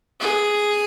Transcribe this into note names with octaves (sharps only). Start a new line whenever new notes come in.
G#4